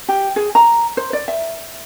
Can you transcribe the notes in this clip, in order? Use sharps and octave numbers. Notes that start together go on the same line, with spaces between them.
G4
G#4
A#5
C5
D5
E5